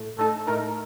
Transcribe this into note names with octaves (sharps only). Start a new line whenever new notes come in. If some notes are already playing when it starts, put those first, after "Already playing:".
Already playing: A2 A3
A2 A3 D#4 A4
A2 A3 D#4 A#4